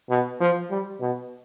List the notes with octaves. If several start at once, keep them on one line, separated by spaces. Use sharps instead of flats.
B2
F3
G3
B2